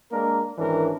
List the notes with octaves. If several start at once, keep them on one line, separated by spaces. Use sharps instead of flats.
G#3 A#3 D4 A#4
G#1 E3 C#4 D4 A#4